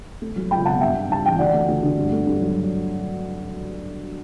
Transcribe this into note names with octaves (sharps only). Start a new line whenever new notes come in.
A3
F#3
C#2 G5 B5
B2 F#5 A5
G2 E5 G5
B3
G2 A5
E3 G5
D2 D5 F#5
A3
D2
D3
G2
A3
G2
F#3